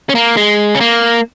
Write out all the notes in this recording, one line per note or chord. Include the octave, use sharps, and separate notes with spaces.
C#4
A#3
G#3
C#4
A#3